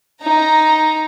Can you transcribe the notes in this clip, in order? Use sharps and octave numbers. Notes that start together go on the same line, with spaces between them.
D#4 A#5